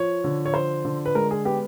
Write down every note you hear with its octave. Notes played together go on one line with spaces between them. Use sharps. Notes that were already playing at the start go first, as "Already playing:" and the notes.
Already playing: F3 C#5
D3
C#5
F3 C5
D3
B4
G#3 A#4
G#4
B3 G4